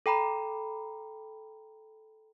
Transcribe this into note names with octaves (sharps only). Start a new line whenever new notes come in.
A4 G5 A#5 B5